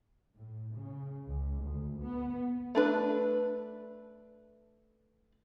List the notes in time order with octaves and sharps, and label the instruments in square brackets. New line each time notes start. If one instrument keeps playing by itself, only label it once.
[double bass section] A2
C#3
C#2
D2
B3
[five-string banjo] A3 D4 B4